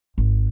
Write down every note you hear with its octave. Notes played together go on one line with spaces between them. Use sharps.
G#1